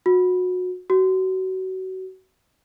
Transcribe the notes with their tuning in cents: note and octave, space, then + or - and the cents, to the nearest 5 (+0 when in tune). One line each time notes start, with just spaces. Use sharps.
F#4 -25
F#4 +25